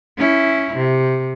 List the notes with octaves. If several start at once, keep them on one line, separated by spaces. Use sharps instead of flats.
C#4 E4
C3